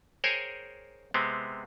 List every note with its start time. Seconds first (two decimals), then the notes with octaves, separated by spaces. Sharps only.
0.24 G#4 A#4 C5 C#5 G5 G#5
1.14 C3 G#3 B3 C4